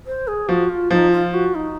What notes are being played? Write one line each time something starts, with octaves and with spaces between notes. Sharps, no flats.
C5
G#4
F3 F#4
F4
F3 D#4 F4
F4
F#4
D#4